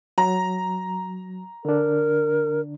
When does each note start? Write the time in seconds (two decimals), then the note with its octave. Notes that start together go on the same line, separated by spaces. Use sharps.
0.18 F#3 A#5
1.65 D3 D4 A#4